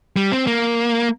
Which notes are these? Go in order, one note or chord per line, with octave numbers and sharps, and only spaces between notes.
G3
C4
A#3